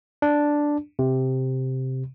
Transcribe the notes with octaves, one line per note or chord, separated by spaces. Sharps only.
D4
C3